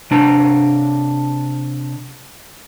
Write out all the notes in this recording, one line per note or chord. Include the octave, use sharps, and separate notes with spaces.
C3 D4 A#5